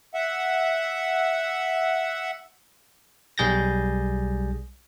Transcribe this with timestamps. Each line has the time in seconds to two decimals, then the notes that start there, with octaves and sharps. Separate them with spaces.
0.14 E5 F#5
3.38 B1 G3 G#4 G6 A6 A#6